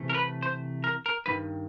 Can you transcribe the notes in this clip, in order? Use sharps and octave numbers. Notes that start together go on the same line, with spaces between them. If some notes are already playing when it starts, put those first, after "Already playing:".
Already playing: C3 E3 A3
A#4
B4
C5
A#4
A#4
G2 D#3 B4